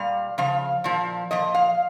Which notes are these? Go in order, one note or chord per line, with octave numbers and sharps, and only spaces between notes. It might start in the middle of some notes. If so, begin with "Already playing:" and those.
Already playing: A#2 G3 F5
C#3 F3 F5
A#2 F3
A#2 F3 D#5
F5